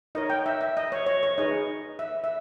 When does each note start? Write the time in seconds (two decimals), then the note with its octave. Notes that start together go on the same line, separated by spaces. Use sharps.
0.15 D#4 A#4 C#5 D#5
0.30 G5
0.46 E5
0.61 E5
0.77 D#5
0.92 C#5
1.07 C#5
1.23 C#5
1.38 D#4 G#4 B4 D#5
1.99 E5
2.24 E5